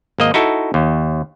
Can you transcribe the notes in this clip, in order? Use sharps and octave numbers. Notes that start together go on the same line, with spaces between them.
G#1 A#3 D#5
D#4 E4 F#4 A4
D#2